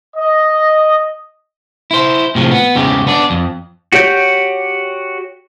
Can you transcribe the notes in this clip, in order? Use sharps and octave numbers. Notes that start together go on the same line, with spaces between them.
D#5
E4 C5
A2 C3 F3
B3
E2 G#2 C#3 G4
B3 D4 D5
F2
F#4 G4 C#5 G6